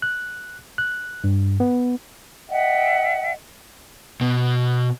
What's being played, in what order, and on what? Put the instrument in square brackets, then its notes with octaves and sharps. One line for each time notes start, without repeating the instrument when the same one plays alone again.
[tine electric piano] F#6
F#6
G2
B3
[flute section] D#5 E5 F#5 G5
[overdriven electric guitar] B2